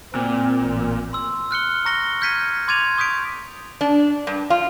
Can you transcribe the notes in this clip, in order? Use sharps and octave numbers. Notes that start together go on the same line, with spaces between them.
A#2 C4
A1
C6 E6
F6 F#6 C#7 G7
A#5 C#6 A#6 C#7 G7
F6 G6 G#6 B6 C#7 D#7
C6 D6 G#6 A6 D#7 F7
C#6 D#6 G6 B6 D7
D4
G2
F4